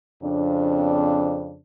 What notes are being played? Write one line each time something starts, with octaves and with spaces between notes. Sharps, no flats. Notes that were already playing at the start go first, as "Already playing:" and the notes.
F2 C#3 C4 D4